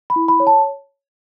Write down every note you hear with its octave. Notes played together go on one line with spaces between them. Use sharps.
B5
E4
B5
C#5
A5